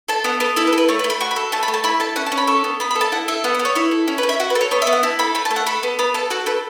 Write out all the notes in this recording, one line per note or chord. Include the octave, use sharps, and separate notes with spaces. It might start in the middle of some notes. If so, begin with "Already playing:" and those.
A4 A5
B3 F#5
B3 A4
E4 A4
B4
A4
B4
A3 C#5
B4
A3
B5
F#4 C#6
B5
A4
A3 A5
B5
A3
A5
E4 B5
A4 A5
C#4 F#5
A5
C#4
B5
A4 C#6
B3
B3 B5
B5
A4
A5
E4 F#5
A4 E5
B3 F#5
F#5
B3
C#5
E4 C#5
A4
C#4
B4
C#4
E5
F#4 F#5
B4
A4
C#5
B3 C#5
E5
B3
F#5
E4 A5
A4 B5
A3 B5
A5
A3
F#5
A4 B5
B3
B3 B5
A4 A5
F#4 A4
A4 B4